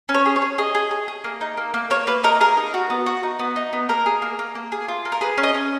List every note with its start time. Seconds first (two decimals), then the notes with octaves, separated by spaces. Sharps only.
0.09 C#4
0.14 C#5
0.26 G#4
0.36 C#5
0.42 G#4
0.58 G#4 D#5
0.75 G#4
0.91 G#4
1.08 G#4
1.24 A#3
1.41 D#4
1.57 A#3
1.74 A#3
1.90 A#3 C#5
2.07 A#3 B4
2.24 D#4 A#4
2.40 G#4 A#4
2.57 D#4
2.74 F#4
2.90 B3
3.06 F#4
3.23 D#4
3.39 B3
3.56 D#4
3.73 B3
3.89 A#3 A#4
4.06 G#4
4.22 A#3
4.39 A#3
4.55 A#3
4.72 G#4
4.88 F4
5.05 A#3
5.12 A#4
5.21 G#4 B4
5.38 C#4
5.43 D#5
5.55 C#4